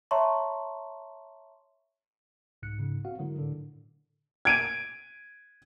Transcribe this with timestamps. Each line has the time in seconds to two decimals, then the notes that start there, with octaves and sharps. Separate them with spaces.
0.11 C#5 E5 A5 A#5 C6 C#6
2.63 C2 G#2 F#6 C#7
2.79 G#2 C#3
3.04 C4 F#4 F5 F#5
3.19 D3 F#3 G#3 E4 A#4
3.38 A2 D3
4.45 G#6 D7 D#7